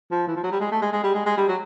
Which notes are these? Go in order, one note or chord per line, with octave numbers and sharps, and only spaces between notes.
F3
E3
F3
F#3
G3
G#3
A3
G#3
G#3
G3
G#3
G#3
G3
F#3